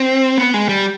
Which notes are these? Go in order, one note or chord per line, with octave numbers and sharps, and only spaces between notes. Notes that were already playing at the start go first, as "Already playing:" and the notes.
Already playing: C4
B3
G#3
G3